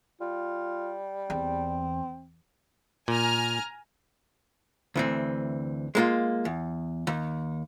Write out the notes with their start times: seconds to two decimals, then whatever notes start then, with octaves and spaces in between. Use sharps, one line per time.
0.21 G3 F4
1.30 E2 C4
3.08 A#2 G#5 A#5 F6
4.96 D2 E3 C4
5.95 G#3 A#3 F4
6.45 E2
7.07 D#2